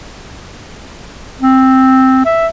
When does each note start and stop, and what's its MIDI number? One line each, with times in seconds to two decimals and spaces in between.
1.41 2.24 60
2.25 2.47 76